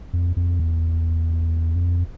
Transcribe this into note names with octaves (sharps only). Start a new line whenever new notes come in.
F2
F2
E2
F2